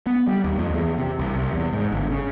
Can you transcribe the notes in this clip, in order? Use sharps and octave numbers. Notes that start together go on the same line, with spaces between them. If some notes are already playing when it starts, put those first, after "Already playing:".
B3
G3
D#2
F2
E2
C3
C2
C2
E2
G#2
G1
C#3